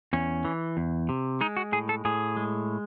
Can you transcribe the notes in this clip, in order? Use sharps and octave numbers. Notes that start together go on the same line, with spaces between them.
E2 C#4
E3
E2
C3
G#3 D#4
F#4
A2 G#4
A4
A2 G#4
G#3